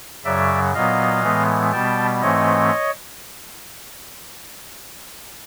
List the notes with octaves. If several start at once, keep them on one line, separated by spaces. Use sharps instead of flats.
F#2 C#3 F#3 D5 E5
A#2 F#3 B3 D#5 F5
A2 E3 G#3 B3
B2 G3 B3 G5 A5
G#2 E3 A3 C4 C#5 D#5